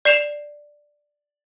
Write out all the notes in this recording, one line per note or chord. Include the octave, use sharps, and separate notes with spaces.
D5 C7 E7 F7